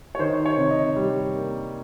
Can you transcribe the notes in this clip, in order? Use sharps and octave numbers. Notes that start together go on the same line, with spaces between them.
C#5
D#3 C5
C#5
C3
D#5
G3
A#3